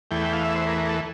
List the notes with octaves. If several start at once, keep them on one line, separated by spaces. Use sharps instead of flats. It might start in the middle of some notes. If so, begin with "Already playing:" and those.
E2 E3 A3 G5
G5
F5
E5
C5
A#4
A#4
A4